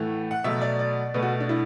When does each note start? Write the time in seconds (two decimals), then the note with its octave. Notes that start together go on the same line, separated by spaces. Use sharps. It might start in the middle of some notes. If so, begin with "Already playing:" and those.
Already playing: A2 E3 A3 F#5
0.31 F#5
0.44 B2 F#3 A3 E5
0.61 D5
0.79 D5
1.14 B2 A3 B4
1.23 F#4
1.40 D4
1.49 E4